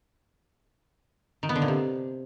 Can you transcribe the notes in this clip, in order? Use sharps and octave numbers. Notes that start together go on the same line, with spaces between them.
D#3
B3
D3
A#2
C3